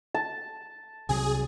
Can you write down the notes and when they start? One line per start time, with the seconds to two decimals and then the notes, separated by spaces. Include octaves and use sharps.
0.14 A5
1.09 C2 C3 F#3 G#4